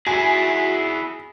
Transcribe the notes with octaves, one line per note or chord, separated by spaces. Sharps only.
E4 F#4 G#4 G#5